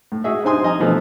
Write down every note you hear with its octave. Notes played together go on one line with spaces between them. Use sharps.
A2
F#4 G#4 D#5 E5
G2 C4 D#4 G#5 C6 D#6
F3 D#5 G#5 A#5
B2 D3 E3 F3 A3